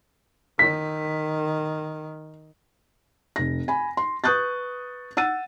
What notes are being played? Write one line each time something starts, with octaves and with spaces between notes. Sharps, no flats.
D#3 B6
F1 A#6
G#5 B5
C6
B4 C#6 D#6 F#6 G6 A6
F#5 E6 A6 D#7